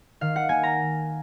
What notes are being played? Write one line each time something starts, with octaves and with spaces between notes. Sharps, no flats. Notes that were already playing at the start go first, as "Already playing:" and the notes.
D#3 F5
F#5
A#3 G#5
A#5